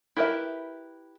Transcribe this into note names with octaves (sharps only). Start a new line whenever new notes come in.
E4 G4 A#4 B4 E5